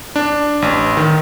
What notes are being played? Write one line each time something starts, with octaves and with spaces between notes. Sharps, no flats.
D4
A1
D#3